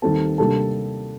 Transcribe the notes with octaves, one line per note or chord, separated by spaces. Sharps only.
D#2 D#3 G3 C4 A4 A5
C3 G3 A#3 D4 A4 A5